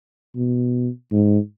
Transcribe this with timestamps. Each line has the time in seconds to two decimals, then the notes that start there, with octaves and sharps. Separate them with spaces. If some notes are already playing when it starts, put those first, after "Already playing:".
0.36 B2
1.12 G#2